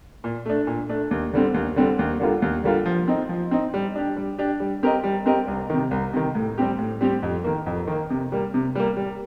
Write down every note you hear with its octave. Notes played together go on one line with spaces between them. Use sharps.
A#2
A3 D4
A#2
A3 D4
D#2
D3 G3 C4
D#2
D3 G3 C4
D#2
D3 G3 A#3 F4
D#2
D3 G3 A#3 F4
F3
C4 D#4
F3
C4 D#4
G3
D4 G4
G3
D4 G4
G3
C4 G4 A#4 D#5
G3
C4 G4 A#4 D#5
C2
C3 D#3
C2
C3 D#3
A2
G3 C4 G4
A2
G3 C4 G4
F2
D#3 A#3
F2
D#3 A#3
C3
G3 A#3
C3
G3 A#3
G3